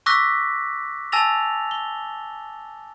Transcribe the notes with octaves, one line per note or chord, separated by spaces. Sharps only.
C#6 D6 E6 F#6 A#6 B6
G#5 A5 E6 A6 A#6 F7
G7